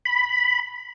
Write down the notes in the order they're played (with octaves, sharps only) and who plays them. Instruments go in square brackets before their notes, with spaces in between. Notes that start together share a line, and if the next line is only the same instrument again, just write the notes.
[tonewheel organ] B5